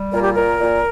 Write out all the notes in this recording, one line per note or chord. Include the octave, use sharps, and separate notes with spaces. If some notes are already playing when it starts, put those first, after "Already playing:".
Already playing: G3
A#2 A#4
G4
A#2 A#4
A#2